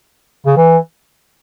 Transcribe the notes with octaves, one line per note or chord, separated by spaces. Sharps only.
C#3
E3